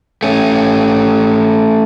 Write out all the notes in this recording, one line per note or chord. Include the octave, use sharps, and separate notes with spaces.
A3 C#4